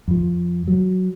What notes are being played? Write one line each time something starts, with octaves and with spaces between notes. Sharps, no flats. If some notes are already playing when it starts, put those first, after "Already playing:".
F2 F3
F#3